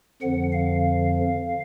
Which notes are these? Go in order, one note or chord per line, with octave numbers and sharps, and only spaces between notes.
F2 D3 F3 F#5
F5